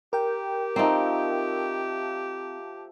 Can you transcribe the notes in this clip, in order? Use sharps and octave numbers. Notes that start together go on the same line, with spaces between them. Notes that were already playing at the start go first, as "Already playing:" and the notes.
G4 A#4 G5
F3 A3 C4 D#4 A#5